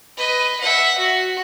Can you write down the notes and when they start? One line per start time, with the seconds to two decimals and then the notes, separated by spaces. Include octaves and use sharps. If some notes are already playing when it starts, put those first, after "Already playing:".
0.17 B4 D#5
0.60 E5 F#5
0.98 F#4